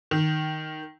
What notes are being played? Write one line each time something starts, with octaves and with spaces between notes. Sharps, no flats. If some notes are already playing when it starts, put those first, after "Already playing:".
D#3